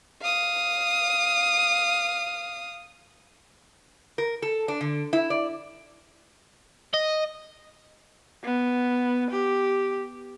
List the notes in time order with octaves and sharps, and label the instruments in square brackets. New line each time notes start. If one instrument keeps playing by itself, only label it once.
[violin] F5 D#6
[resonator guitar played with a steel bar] A#4
A4
D4
D3
E4
D5
[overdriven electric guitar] D#5
[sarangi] B3
G4